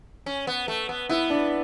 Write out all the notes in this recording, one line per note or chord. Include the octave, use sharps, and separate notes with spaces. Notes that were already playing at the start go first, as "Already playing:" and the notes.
C#4
B3
A3
B3
B3 E4
D4